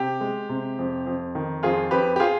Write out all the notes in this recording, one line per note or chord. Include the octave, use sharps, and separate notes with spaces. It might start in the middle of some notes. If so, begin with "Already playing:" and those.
Already playing: C3 G4
G#3
C3
F2
F2
D#3
F2 F4 G#4
F2 G4 B4
G4
F4 G#4